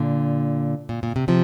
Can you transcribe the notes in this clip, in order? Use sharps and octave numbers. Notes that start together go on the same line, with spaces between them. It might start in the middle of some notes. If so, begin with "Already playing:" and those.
Already playing: A#2 D3
A#2
A#2
C3
C3 F3